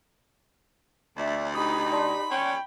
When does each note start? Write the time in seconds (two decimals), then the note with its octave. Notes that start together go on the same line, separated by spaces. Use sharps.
1.17 D2 D4 E5
1.55 D#4 G4 B5 D#6
1.92 D5 A5 C6
2.31 C#4 G5